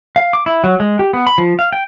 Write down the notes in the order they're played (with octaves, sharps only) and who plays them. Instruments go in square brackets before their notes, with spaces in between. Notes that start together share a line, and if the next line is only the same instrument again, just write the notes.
[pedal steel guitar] F5
D6
E4
F#3
G#3
G4
B3
B5
F3
F5
G5